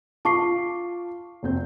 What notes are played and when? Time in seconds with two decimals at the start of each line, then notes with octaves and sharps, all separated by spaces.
0.25 F4 A5 C#6 D6 C7
1.43 F1 C4 G6